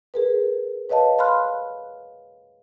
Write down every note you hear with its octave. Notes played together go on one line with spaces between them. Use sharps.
G#4 A#4 B4
B4 C#5 D#5 F5 A5
F5 B5 C6 F6 F#6